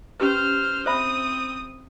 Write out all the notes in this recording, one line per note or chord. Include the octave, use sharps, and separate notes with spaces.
C#4 G4 B4 C5 F6
C4 C5 E5 B5 D#6